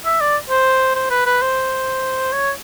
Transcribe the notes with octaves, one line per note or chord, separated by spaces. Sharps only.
E5
D5
C5
C5
B4
B4
C5
C#5